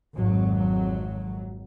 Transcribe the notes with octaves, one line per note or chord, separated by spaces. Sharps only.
G#1 F2 F#3